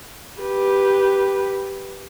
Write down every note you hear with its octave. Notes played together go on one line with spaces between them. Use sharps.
G4 B4